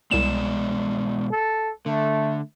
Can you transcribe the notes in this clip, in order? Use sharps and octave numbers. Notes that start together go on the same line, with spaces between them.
C2 B2 G#3 D5 E7
A4
D3 A3